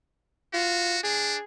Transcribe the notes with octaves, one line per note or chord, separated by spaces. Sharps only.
F4 F#4
D4 G#4